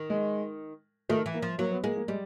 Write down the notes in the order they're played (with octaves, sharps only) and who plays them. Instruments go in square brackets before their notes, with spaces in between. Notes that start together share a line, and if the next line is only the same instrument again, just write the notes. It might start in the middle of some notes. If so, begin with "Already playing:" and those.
Already playing: [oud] D#3
[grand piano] G#3
[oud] D#3 [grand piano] A3
[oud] E3
[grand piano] A#3
[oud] F3
[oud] F#3 [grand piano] A#3
[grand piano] B3
[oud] G#3 [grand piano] A#3
[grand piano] A#3
[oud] G3 [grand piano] G#3